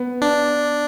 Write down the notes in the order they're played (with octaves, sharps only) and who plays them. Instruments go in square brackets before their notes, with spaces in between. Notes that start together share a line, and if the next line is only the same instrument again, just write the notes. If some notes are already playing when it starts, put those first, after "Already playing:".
Already playing: [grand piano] B3
[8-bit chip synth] D4